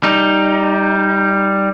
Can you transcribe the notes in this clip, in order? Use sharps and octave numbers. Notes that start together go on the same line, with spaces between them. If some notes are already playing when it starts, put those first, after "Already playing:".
G3 D#4